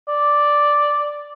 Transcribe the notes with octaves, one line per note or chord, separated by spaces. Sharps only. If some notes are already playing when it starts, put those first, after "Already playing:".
D5